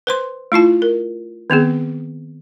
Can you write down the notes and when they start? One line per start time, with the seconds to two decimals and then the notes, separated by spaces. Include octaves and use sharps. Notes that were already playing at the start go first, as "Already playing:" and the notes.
0.07 B4 C5 C6
0.52 A3 E4 F4 A5
0.82 A#4
1.50 D#3 B3 C4 G#4